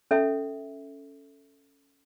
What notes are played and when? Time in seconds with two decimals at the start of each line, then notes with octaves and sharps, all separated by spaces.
0.11 C#4 A4 E5